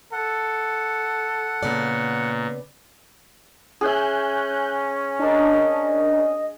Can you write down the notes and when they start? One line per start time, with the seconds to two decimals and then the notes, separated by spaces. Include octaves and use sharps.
0.13 A4 F#5
1.63 A#2 C#3 B3 D5
3.81 C#4 G#4 E5 G#5 F#6 G6
5.19 D4 A#4 D#5